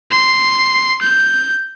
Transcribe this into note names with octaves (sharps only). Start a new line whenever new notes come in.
C6
G6